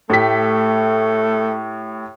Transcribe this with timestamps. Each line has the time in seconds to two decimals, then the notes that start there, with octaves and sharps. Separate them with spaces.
0.10 A2 A3 G4 B6